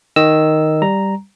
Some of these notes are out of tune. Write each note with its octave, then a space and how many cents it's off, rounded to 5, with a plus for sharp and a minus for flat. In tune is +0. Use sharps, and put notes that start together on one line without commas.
D#3 +0 D#5 +0 E6 +0
G3 +0 A#5 +0